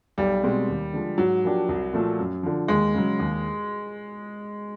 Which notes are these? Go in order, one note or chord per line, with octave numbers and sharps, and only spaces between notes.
B1 G3
B2 G#3 C4
D#2
D3 F3 G#3
G#2 F#3
F3 A#3 D4 G4
C2
A#2 F3 A3
F#2
D3 F3
D#2 G#3
C#3 F#3
D#2